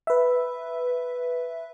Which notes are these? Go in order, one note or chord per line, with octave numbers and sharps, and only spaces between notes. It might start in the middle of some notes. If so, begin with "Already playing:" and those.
B4 E5